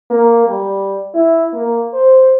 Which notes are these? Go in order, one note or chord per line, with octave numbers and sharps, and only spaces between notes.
A#3
G3
E4
A#3
C5